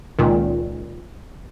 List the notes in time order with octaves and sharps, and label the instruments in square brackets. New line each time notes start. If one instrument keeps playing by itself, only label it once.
[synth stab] C#2 A#2 D#3